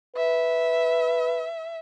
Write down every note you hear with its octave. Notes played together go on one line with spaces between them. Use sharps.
B4 E5